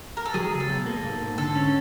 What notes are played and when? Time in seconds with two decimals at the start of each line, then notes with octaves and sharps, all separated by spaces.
0.17 A#4
0.26 A4
0.34 F#3 G#4
0.52 C#2
0.60 A4
0.69 B2
0.86 A#3
1.04 G#2
1.21 G#2
1.38 D3 A4
1.55 C#4